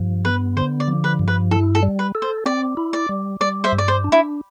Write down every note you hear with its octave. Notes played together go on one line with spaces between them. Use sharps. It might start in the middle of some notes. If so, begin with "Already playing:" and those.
Already playing: G2 F3
B3 B4
D3 C5
D5
F3
B4
G2
B4
E4 A4
A4
G3
B4
A4
C5
C4 D5
E4
D5
G3
G3 D5
C5 E5
G2
D5
C5
D4
E4